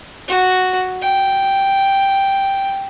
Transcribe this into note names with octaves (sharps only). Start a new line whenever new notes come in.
F#4
G5